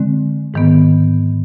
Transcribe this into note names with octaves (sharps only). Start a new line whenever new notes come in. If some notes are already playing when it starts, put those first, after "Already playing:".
Already playing: D3 G#3 C4
G#2 D#3 B3